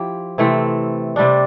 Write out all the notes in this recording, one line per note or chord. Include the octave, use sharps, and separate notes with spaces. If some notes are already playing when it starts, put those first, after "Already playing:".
Already playing: F3 E4 G4
C3 E3 A3 C4
C3 G3 D4